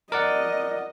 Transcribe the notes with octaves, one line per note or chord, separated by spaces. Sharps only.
A#4 D5 D#5 F#5